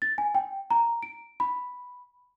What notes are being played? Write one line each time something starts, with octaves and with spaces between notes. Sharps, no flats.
A6
G#5
G5
A#5
D7
B5